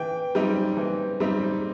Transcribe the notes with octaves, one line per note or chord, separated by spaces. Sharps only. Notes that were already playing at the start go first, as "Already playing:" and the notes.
Already playing: E3 G5
G3 C4 D#4
E3
G3 C4 D#4